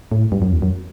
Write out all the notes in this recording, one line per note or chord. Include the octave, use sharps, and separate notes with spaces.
A2
G2
F#2
E2
F#2